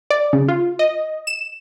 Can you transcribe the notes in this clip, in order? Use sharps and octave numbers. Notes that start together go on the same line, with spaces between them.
D5
C#3
F4
D#5
E7